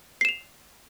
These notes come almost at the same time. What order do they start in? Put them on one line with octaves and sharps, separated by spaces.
C7 E7 F7